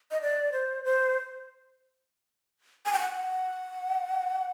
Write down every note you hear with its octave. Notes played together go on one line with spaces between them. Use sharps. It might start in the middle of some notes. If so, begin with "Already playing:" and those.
D#5
D5
C5
C5
G#5
G5
F#5